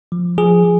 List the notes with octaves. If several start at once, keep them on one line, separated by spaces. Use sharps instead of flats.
F3
F3 G#4
F3